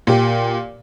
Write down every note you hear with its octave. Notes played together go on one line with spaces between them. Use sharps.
A#2 G4